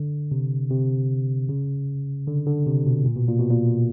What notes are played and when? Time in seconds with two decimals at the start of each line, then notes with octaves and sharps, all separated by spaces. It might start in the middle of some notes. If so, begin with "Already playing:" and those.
Already playing: D3
0.31 C3
0.71 C3
1.49 C#3
2.27 D3
2.47 D3
2.66 C3
2.86 B2
3.05 A#2
3.16 B2
3.29 A#2
3.40 B2
3.50 A#2